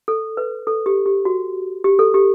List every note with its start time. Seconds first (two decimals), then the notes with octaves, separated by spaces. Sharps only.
0.08 A4
0.37 B4
0.67 A4
0.86 G4
1.06 G4
1.25 F#4
1.84 G4
1.99 A4
2.14 G4